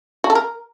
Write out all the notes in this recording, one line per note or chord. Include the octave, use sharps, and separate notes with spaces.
F#4
A4
A#4